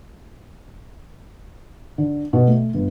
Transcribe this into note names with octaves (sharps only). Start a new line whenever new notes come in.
D3
B2
A3
G1